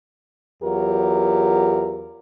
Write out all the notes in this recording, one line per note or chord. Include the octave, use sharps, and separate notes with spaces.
E2 F#3 F4 G4 A#4